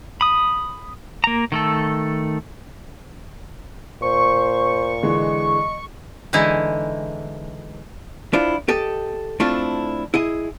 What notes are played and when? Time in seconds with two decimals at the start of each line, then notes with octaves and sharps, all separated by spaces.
0.21 B5 D#6
1.24 A#3 A#5
1.52 D#3 A3 A4
4.02 A#2 C5 C#6
5.03 D3 E3 G#3 D#5
6.33 D3 E3 G#3 D#4 E4
8.33 D4 E4 F4 C5
8.68 G4 A4 D#5
9.40 A3 C4 D4 E4 F4 A4
10.14 E4 G#4 D#5